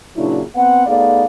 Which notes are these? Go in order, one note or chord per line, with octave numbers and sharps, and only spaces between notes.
A#2 C#3 F#3 D4 E4
B3 C4 B4 F#5
A3 B3 D#4 G#4 D5 F5